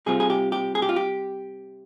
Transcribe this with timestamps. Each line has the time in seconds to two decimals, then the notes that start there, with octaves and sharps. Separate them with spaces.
0.06 C3 G3 C4 F4 G#4
0.20 G#4
0.30 G4
0.52 G4
0.75 G#4
0.82 G4
0.89 F4
0.96 G4